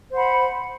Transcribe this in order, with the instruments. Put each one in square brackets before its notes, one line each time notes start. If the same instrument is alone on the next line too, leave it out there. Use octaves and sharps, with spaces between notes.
[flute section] C5 F#5 B5